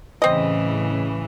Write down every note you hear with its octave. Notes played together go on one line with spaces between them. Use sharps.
A2 C#3 E3 C4 D#5